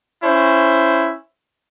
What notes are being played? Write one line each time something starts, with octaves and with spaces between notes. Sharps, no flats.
C#4 E4 C5